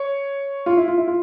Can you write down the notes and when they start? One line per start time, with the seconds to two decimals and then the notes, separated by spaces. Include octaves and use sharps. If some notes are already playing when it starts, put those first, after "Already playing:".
Already playing: C#5
0.66 F4
0.77 E4
0.88 F4
0.98 E4
1.07 F4